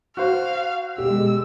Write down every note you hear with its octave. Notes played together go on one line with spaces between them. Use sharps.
F#4 C5 F5
B2 D3 G#3 G4 E6